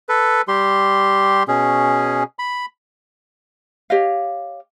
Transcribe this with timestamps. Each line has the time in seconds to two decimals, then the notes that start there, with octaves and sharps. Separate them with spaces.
0.09 A4 B4
0.48 G3 G4 C6
1.48 B2 C#4 G#4
2.39 B5
3.90 G4 C#5 D#5 F5